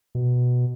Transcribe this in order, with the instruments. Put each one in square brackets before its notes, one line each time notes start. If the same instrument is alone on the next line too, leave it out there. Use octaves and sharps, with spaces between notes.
[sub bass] B2